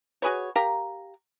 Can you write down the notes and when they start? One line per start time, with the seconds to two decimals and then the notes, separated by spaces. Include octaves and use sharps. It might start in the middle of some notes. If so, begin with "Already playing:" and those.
0.22 F#4 G#4 B4 C#5
0.56 G4 A#4 F5 A#5